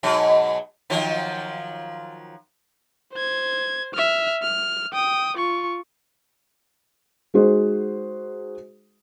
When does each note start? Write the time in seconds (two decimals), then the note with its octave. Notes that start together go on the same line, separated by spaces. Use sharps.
0.03 G#2 B2 F#3
0.90 D#3 F3 F#3
3.13 C5 G#6
3.94 E5 F6
4.43 F6
4.93 G5 D#6
5.37 F4 C#6
7.34 G#3 D#4 F#4 G#4 C5